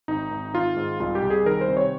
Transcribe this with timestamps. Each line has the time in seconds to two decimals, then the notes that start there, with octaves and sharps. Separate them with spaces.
0.08 G#1 D#4
0.31 G#1
0.54 D#3 F4
0.76 G#2
1.00 C2 F4
1.15 G4
1.23 C2
1.30 G#4
1.45 D#3 A#4
1.61 C5
1.68 C3
1.77 C#5